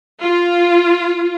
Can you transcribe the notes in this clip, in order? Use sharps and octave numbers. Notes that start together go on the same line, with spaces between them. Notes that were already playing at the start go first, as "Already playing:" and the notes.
F4